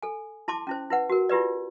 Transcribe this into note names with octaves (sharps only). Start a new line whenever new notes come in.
A4 G#5
E4 A5 C6 D6
C#4 E4 C5
E4 B4 F#5
F#4 A#4
E4 F4 G4 B4 D5